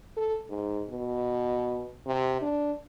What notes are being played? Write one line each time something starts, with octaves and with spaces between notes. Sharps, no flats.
A4
G#2
B2
C3
D4